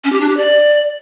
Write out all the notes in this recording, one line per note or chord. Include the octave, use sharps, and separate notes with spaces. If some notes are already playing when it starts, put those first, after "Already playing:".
C#4
G4
D4
G4
D5